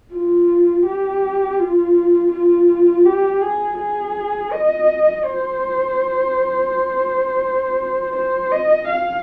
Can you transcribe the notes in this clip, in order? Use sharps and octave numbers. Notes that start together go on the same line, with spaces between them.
F4
G4
F4
F4
G4
G#4
G#4
D#5
C5
C5
D#5
F5